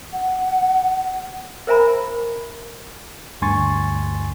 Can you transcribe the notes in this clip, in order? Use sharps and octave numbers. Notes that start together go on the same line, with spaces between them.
F#5
A#4 C5 E5 G#5 A#5 B5
D2 G2 G#5 C6 C#6 A6